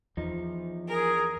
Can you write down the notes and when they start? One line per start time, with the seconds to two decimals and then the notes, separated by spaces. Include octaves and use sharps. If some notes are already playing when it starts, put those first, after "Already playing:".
0.17 E2 F3 D#4
0.89 G#4 A#4